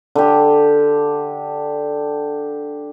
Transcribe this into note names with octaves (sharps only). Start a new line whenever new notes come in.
D3 G4